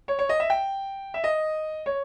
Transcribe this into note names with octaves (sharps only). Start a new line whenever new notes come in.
C#5
C#5
D#5
E5
G5
E5
D#5
C#5